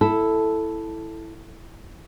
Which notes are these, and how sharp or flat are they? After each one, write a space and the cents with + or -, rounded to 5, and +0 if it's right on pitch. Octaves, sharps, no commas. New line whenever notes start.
E4 +0 A4 +0